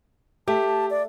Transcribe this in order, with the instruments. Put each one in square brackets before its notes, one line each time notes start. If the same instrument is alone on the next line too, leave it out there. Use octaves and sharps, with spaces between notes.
[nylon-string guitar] A3 [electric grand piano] G4 [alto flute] A5
[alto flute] D5